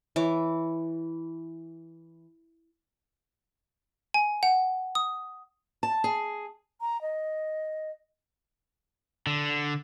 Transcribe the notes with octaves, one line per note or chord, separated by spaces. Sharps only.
E3 C#5 D6
G#5
F#5
D#6
A5
G#4
A#5
D#5
D3